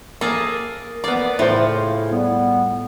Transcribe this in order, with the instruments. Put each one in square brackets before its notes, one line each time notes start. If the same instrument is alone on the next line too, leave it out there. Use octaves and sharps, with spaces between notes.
[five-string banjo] A#3 [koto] G#4 A4
[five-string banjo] A#3 B3 [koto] D5
[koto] A2 [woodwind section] C#3 E4 [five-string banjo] F4 C5
[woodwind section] G3 B3